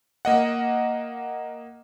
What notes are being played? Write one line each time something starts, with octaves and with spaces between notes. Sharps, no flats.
A#3 D#5 F#5